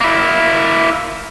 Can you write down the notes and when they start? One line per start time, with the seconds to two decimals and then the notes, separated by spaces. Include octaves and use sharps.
0.01 A#3 E4